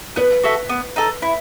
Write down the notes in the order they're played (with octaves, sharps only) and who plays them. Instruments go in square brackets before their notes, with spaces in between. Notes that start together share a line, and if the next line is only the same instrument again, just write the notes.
[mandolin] B3 [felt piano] B4
[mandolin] F#4 A4 E5
B3
D#4 A4
E4